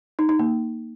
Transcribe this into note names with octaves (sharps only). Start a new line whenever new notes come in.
D#4
D#4
A#3